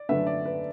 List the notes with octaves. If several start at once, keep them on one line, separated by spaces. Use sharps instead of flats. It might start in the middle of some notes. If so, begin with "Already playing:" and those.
Already playing: D5
F#2 D3 A3 D4 B4 E5
D5
B4